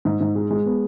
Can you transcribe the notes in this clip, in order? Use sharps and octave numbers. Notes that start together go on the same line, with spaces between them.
G#2
G#2
G#3
G#3
B3